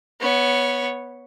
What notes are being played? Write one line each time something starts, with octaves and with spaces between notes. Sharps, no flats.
B3 C#5